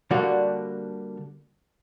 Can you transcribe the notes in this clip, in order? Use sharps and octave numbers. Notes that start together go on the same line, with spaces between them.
D3 G3 A#3 D4 F#4